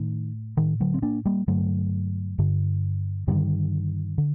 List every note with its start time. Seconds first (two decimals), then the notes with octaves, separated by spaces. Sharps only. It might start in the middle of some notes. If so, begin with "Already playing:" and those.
Already playing: A2 D#3
0.57 A2 D#3
0.80 D3 F#3
0.94 C4
1.02 A#3 D4
1.25 G3 A#3
1.48 G2 D3 F#3 A3
2.38 G2 D3
3.27 G2 D3 D#3 G3
4.18 D3